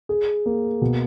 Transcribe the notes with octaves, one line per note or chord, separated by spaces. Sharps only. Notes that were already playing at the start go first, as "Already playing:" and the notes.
G#4
A#3
B2